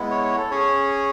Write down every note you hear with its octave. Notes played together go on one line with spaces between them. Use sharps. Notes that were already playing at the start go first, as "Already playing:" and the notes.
Already playing: G#3 B3 E4
C#5
C#5
A4
C#4 G#4 C#5